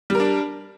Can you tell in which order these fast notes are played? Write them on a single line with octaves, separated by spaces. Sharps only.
G3 A#4 D4